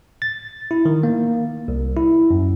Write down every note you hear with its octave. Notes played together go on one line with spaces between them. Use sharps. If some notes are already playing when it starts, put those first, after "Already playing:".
A6
E4
D#3
A#3
C2
E4
F#2